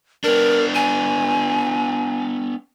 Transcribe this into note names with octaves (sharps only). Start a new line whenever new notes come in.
B3 D4 A#4
G#5